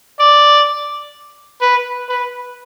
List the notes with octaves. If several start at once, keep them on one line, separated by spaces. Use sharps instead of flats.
D5
B4
B4